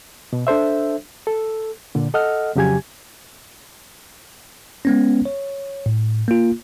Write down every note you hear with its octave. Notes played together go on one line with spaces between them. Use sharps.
B2
D4 A4 C5 E5
A4
A#2 D3
A4 D#5 F#5 F6
F2 C#3 F#3 G4 G#5 G#6
G#3 B3 C#4
C#5
A2
A#3 F4